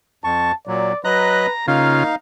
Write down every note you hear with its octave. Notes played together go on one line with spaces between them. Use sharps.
F2 A5 C#6
A#2 F#3 D5
F#3 B4 D#5 A#5 F#6
C#3 A#3 D#4 F4 F5